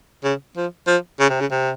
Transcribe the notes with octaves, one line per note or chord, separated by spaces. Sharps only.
C#3
F3
F3
C#3
C3
C#3
C3